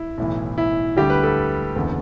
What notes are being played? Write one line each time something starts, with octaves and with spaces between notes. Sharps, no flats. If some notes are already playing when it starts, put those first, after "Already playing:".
Already playing: E4
B1 A2 E3
E4
D2 D3 G3 G4
B4
A4
F#1 E2 D3